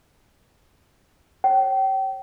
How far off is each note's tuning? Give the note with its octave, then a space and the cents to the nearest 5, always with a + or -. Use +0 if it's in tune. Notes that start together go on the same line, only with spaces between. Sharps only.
C#5 -25 G5 -30